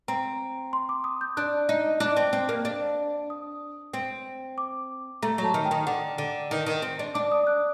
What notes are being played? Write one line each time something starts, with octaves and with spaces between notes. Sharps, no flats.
C4 A#5
C6
D6
D#6
G6
D4 F#6
D#4
D4 F#6
C4
C4
A#3
D4
D#6
C4
D6
A3 A#5
F#3
A5
D#3
G5
D#3
D3 F#5
D3
D#3
D#3
C4
D4
D4 D6
D#6
F#6